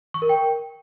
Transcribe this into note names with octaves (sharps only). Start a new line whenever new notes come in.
C#6
A#4
G5